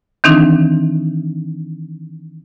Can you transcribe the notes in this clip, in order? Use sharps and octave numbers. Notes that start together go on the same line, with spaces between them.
D#3 E3 C4 D4 D#4